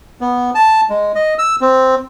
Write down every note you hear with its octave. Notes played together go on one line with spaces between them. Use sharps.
B3
A5
G#3
D#5
E6
C4